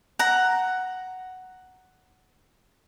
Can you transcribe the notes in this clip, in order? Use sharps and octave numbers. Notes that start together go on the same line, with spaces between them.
F#5 A#5